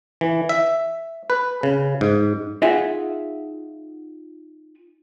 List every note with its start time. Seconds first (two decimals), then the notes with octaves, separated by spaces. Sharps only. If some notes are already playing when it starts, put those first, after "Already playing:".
0.21 E3
0.49 E5
1.30 B4
1.63 C#3
2.01 G#2
2.62 D#4 F4 G#4 E5 F#5 G#5